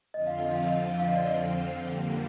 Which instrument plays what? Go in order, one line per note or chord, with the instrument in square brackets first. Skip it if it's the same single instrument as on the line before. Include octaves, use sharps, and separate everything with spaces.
[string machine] F2 D3 F3 C4 F4 [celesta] D#5
[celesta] F5
D#5
F5
D#5
F5
D#5
D5
D#5
[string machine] F2 D3 G3 A#3